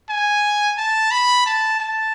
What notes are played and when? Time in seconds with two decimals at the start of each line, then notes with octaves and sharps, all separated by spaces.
0.09 G#5
0.78 A5
1.11 B5
1.46 A5
1.80 A5